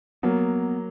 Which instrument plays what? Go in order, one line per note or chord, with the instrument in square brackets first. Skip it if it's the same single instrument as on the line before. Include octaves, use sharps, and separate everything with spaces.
[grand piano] F#3 A#3 [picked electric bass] B3